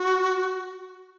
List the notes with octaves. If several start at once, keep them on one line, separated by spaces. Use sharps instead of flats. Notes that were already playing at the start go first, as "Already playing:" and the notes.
Already playing: F#4